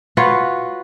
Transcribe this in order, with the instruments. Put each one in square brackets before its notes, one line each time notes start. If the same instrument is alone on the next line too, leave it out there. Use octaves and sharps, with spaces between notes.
[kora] F4 F#4 B4 C#5